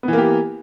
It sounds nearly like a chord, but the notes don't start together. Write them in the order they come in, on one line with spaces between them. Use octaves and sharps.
B3 E3 A#3 G4